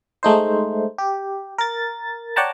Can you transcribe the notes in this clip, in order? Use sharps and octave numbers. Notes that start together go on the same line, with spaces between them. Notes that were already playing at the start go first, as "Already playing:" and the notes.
G#3 A3 D#4 C5
G4
A#4 A6
C#5 D5 F#5 G5 A5 A#5